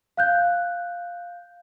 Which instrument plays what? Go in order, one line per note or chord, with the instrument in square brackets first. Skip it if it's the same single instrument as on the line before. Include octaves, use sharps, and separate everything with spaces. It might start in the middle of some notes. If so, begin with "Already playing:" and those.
[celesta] F5 F#6 G6